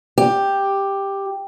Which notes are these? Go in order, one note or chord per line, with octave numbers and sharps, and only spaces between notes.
G4